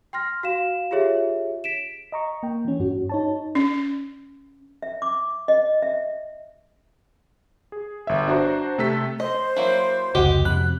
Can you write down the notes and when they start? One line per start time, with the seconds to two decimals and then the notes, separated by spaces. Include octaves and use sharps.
0.13 G5 C6 F6 A#6
0.43 F#4 F5 E7
0.91 F4 G4 G#4 C#5 E5
1.64 B6 D7 E7
2.12 D#5 A#5 C#6
2.43 A#3 G5
2.65 E3 C#4
2.80 G2 F#4
3.09 D#4 C#5 A5
3.55 C#4
4.83 E5
5.02 D6
5.48 D#5
5.82 E5
7.72 G#4
8.07 G1 E5
8.28 D4 F#4 C5 A#5
8.78 C3 A3 A4 E6 B6
9.20 C5 D#5
9.56 F#3 A#3 E4
10.15 F1 C#2 F#4 G4 D#5 F#5
10.45 F2 C3 B5 F#6